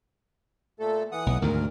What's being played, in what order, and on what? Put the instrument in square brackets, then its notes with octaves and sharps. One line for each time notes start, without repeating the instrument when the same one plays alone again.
[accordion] A#2 A3 A4
E3 F#5 D#6
[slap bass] B1
[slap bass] D2 G#2 D#3 [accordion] A#4